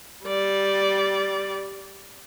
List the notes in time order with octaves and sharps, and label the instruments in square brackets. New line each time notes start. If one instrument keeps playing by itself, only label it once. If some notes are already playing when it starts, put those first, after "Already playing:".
[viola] G3 D5